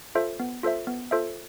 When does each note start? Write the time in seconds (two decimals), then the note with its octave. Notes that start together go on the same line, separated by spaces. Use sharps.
0.15 F4 A4 C5 E5
0.40 B3
0.63 F4 A4 C5 E5
0.87 B3
1.11 F4 A4 C5 E5